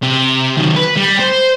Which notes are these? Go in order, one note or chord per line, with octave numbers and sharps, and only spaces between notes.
C3
D#3 F#3
B4
G3
C5